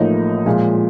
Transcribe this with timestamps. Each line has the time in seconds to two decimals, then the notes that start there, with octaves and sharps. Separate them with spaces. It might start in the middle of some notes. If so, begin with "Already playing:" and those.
Already playing: A1 A2 F3 A#3 D#4
0.46 A#2 F3 G#3